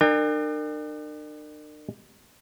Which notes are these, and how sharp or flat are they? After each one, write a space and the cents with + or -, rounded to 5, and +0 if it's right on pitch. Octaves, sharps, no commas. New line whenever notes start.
D4 +40 A#4 -25 G5 +40